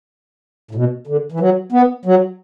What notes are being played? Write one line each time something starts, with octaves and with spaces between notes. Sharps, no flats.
A2
B2
D3
E3
F#3
B3
F#3